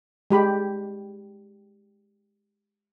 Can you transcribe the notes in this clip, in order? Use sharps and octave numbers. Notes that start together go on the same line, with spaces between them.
G#3 G4 B5